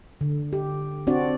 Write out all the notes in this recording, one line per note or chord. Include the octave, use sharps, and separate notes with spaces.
D3
G4
C4 D4 F#4 D5